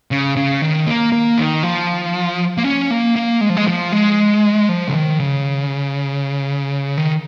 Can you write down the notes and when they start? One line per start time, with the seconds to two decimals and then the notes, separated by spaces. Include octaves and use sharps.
0.11 C#3
0.36 C#3
0.62 D#3
0.87 A#3
1.12 A#3
1.37 D#3
1.63 F3
2.58 A#3
2.64 C#4
2.91 A#3
3.16 A#3
3.41 G#3
3.49 F3
3.57 G#3
3.67 F3
3.92 G#3
4.69 F3
4.88 C#3
4.94 D#3
5.20 C#3
6.97 D#3